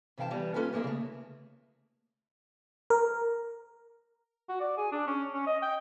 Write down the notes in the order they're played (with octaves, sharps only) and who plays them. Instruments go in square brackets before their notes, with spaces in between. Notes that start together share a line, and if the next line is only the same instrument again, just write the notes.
[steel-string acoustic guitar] C3 E3 F5 G5 A5
E3 G3 B3
A#3 C#4 F4 A4 B4 G#5
E2 F3 A#3 G#4 E5
C#3 A3
[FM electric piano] A#4
[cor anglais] F#4
D5
G#4
D4
C#4
C#4
D#5
G5